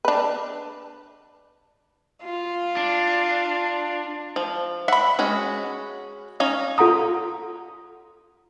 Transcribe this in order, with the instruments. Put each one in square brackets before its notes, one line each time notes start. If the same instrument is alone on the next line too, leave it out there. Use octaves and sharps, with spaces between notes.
[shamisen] D4 B4
[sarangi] F4
[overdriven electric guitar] D4
[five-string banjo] F3
[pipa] E5 B5 [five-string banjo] F#5
[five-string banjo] G#3 C#4 F#4
C#4 D#4 F5
[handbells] F4 A4 F#5 A#5 D#6